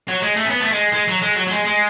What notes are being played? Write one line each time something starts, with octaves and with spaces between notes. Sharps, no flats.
F#3
G#3
A3
C#4
B3
A3
G#3
G#3
F#3
G#3
F#3
F#3
G#3
G#3